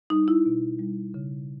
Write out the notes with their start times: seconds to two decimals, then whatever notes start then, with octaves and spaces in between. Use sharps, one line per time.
0.10 G3 D#4
0.28 E4
0.46 B2
0.79 G3
1.14 C#3